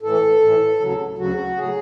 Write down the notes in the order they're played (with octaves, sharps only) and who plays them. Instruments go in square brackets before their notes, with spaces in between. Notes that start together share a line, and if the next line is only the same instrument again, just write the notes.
[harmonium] A2 E3 A4
A2 E3
D2 C#3 F#3
D2 C#3 F#3 F#4
A2 F#3 G#4